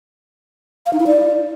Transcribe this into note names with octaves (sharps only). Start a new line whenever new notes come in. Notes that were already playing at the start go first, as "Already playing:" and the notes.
F5
D#4
E4
D5